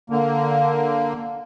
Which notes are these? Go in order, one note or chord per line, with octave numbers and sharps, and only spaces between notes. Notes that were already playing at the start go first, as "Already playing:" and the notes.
D3 A#3